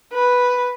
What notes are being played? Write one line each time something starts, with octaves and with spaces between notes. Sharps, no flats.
B4